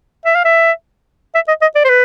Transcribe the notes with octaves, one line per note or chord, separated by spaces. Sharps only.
E5
F5
E5
E5
D#5
D#5
D5
C5
B4